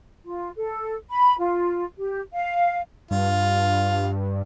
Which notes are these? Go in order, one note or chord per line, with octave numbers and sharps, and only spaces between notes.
F4
A4
B5
F4
G4
F5
G2 F4